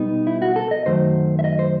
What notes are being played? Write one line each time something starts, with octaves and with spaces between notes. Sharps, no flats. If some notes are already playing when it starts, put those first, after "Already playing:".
Already playing: B2 G3 B3 D#4
E4
F#4
A4
D#5
F#2 D#3 F#3 A3 C5
E5
D#5
C5